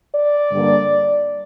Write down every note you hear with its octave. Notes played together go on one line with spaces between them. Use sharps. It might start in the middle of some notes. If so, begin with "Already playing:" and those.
D5
G2 D3 G3 A#3